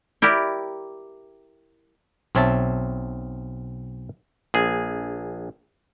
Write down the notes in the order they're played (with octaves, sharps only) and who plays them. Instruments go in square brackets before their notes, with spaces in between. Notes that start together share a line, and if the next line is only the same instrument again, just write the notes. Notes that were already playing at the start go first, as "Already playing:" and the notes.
[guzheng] E4 G4 A#4 D5
[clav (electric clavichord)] B1 C4 C#5 E5 A5
A#1 G#4